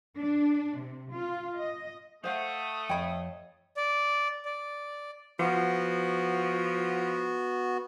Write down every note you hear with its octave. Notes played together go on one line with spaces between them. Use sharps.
D4
C3
F4
D#5
A3 C5 F5 F#5 D#6
F2 C#5 F5 G5 B5
D5
D5
F3 B3 F#4